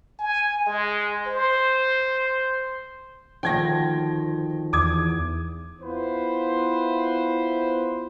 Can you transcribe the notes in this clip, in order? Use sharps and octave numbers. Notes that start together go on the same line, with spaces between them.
G#5
G#3
C5
D2 D#3 F3 G5 G#6 A#6
E2 D6 D#6 G#6
B3 E4 F4 B4 C5